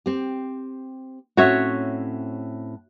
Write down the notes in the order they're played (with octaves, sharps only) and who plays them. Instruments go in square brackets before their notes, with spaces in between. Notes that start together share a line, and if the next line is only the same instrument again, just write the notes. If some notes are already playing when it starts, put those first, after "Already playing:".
[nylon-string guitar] C4 G4
[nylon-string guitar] A2 C4 C#4 [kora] F#4 C#5 E5